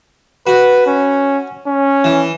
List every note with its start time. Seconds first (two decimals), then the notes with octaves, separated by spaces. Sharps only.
0.47 F#4 B4
0.87 C#4
1.67 C#4
2.04 E3